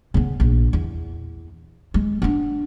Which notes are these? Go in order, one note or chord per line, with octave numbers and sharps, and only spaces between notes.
C#3 B3
A#1
E2
G#3
B3 D4